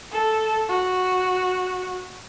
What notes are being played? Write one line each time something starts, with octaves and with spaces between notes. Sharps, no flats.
A4
F#4